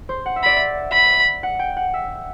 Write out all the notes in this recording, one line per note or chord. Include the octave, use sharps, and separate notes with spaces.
C5
F#5
E5
D5 B5
E5
B5
F#5
G5
F#5
E5